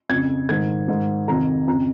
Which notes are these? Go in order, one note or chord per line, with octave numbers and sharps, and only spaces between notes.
F2 C#3 G#6
G#2 D#3 G#6
G#2 D#3
F2 C3 D#3 A#5
F2 C#3 A#5